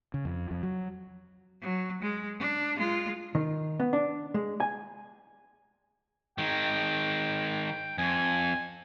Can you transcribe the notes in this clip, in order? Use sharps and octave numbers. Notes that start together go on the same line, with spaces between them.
C#3
F2
F2
F#3
F#3
G#3
D4
G#3 F4
D#3
B3
D4
G#3
G#5
D#3 G#3 G5
F2 G#5